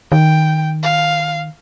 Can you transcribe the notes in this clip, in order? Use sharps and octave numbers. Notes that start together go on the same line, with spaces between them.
D#3 G5
F5